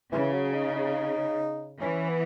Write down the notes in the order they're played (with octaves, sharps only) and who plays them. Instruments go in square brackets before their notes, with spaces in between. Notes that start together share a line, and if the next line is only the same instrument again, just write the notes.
[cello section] C#3 [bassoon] E3
[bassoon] F#3
D#4
D#4
[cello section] E3 [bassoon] C#4
[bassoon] B3